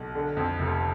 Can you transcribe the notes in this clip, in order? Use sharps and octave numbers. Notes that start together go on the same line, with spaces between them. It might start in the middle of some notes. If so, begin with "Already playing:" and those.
Already playing: B1
D3
F2
F1